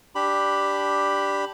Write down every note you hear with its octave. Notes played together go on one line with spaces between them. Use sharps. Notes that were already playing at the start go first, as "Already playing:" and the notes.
D4 G4 B5